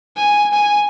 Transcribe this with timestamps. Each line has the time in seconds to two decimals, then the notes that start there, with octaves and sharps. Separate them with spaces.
0.17 G#5
0.53 G#5